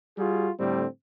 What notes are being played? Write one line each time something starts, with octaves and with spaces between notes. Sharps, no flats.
G3 F4 F#4 G#4
A2 D3 G3 C4